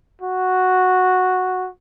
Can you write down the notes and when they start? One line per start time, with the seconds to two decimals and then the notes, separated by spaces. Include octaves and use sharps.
0.22 F#4